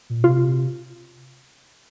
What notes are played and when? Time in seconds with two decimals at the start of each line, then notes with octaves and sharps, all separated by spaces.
0.10 A#2
0.23 C3 F4